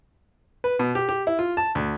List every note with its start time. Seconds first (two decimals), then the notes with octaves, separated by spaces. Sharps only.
0.64 B4
0.79 B2
0.95 G4
1.09 G4
1.27 E4
1.39 F4
1.57 A5
1.75 D2